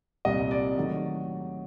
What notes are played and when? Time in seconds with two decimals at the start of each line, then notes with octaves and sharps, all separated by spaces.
0.25 C2 A#2 G3 D#5
0.51 D5
0.78 D#3 F#3 A3